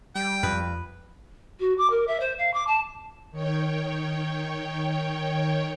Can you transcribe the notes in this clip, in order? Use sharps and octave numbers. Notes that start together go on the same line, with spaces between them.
G3 G5
F2 B4
F#4
D6
A#4
E5
C5
F5
D6
A5
D#3 C#5 G5